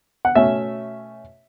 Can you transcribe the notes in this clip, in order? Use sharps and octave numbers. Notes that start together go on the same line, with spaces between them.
F#5
B2 A3 C#4 E5